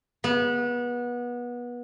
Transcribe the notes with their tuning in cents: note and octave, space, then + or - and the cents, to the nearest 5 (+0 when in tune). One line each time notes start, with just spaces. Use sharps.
B3 -25